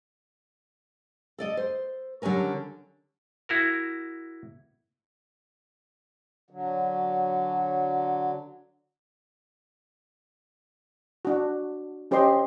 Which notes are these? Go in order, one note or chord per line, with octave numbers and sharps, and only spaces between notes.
A4 D5 D#5
C5
D3 F#3 G3 C#4 A#4
E4 F#4 A#4
D3 F#3
D4 F#4
C#4 G4 C5 D#5 C6